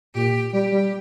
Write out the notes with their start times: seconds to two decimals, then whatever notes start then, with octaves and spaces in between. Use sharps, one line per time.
0.15 A#2 G4
0.53 G3 G4
0.72 G3